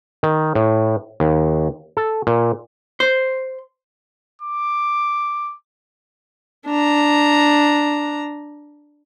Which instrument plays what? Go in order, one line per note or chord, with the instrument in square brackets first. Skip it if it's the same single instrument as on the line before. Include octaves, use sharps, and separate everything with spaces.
[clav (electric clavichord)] D#3
A2
D#2
A4
A#2
[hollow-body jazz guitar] C5
[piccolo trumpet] D6
[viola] D4 A#5